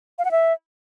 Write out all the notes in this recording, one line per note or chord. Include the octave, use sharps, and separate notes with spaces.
F5
F#5
E5